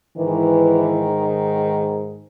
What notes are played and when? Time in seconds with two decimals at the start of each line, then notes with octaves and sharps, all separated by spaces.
0.18 G#2 D#3 E3